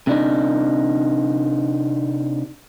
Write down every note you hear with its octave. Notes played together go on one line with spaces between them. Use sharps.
C3 D4 D#4